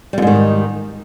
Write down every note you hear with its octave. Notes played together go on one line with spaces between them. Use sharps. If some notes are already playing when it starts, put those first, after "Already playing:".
F2 G#2 D#3 G3